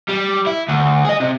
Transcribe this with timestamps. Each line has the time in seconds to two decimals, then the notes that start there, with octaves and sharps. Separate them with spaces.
0.09 G3
0.46 E4
0.68 D2
1.05 G#4 D#5
1.20 C3